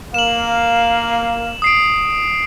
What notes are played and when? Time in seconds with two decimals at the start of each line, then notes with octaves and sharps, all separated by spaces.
0.14 A#3 F5 E7 F#7
1.62 D#6 C7 D7